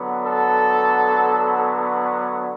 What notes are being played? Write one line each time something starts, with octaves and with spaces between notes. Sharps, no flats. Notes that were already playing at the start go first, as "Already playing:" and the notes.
Already playing: D3 F#3 B3
A4